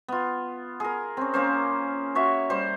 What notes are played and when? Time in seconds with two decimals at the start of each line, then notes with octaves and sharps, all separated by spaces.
0.08 B3 F4
0.80 G#4 A#4
1.17 C4 C#4
1.34 A#3 C#4 C5
2.15 F#4 C#5 E5
2.50 G3 C5